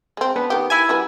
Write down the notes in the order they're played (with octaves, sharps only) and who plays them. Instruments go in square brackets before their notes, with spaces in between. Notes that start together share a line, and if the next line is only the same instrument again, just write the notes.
[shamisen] G#3 C4
[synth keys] B3 [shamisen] D4
[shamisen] D#3 G4
[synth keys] E4 E5 G#5
[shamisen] G3 F#4 B4